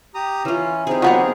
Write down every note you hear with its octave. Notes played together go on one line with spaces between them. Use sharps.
G4 A#5 D#6
E3 C#4 F4
C4 D#4 G4 G#4
F#3 B3 F4 F#4 G#4 A#4